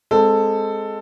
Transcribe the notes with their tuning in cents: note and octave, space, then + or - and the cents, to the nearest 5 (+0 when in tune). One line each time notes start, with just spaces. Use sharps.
G#3 +0 C4 +0 A4 +10